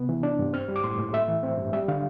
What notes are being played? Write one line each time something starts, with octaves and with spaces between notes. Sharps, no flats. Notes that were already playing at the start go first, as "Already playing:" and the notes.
Already playing: C3 B3
E3
D4
G2
C4 F6
G3
D6
A2 C6
A2
A3 E5
E3
C4
G2
G3 E5
D3 F5